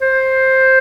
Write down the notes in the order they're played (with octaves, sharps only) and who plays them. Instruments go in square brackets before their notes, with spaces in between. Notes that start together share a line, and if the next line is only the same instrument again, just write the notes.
[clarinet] C5